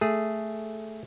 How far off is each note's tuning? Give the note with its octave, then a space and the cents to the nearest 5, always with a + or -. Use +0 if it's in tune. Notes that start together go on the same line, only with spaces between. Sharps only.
A3 +0 G#4 +0